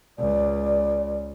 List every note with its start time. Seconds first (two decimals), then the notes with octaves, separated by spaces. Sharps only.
0.19 C#2 D5